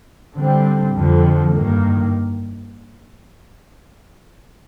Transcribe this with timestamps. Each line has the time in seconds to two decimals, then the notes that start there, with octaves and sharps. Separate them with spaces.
0.34 D3 G3 C4
0.93 F2 D3 F3
1.54 G2 D#3 A#3